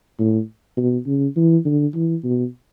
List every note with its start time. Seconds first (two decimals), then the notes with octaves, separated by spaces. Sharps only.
0.19 A2
0.77 B2
1.07 C#3
1.36 E3
1.66 D3
1.95 E3
2.24 B2